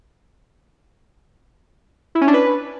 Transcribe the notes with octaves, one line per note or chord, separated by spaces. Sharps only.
E4
C#4
D4
B4